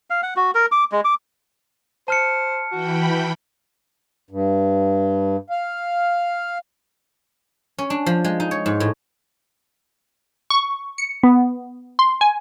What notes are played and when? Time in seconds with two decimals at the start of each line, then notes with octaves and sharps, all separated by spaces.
0.10 F5
0.23 F#5
0.36 F#4
0.55 A#4
0.72 D6
0.92 G#3
1.05 D6
2.08 C5 A5 F6 C#7
2.72 E3 F#4 G5 B5
4.30 G2
5.50 F5
7.78 C#4
7.90 D4
8.06 F3
8.24 G#3
8.40 D#4
8.51 C#5
8.66 G#2
8.80 A2
10.50 C#6
10.98 C#7
11.23 B3
11.99 C6
12.21 G#5